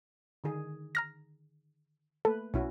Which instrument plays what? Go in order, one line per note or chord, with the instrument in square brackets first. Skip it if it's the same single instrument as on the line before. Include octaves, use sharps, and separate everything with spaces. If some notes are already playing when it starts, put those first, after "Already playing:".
[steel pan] D3 D#3 G#4
[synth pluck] A#5 F6 A#6
[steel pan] A3 A#3 B4 [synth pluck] A4
[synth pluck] B1 [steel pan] C#4 E4 F#4